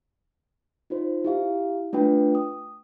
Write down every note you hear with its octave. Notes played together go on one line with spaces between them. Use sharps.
D#4 F4 C5
E4 G4 F5
A3 D4 F4 B4 G5
D#6